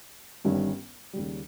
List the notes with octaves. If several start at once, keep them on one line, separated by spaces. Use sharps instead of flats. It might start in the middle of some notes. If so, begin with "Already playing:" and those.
G1 G2 D#3 G3 C#4
D#2 C#3 G3